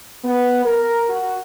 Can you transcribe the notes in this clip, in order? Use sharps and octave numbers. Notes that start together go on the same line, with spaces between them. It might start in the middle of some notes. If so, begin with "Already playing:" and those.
B3
A#4
F#4